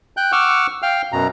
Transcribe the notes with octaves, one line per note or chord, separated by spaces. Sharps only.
G5 F#6 G6
F#5 C#6 D6 E6 F6
F5 G5 F6
F#2 B2 A#5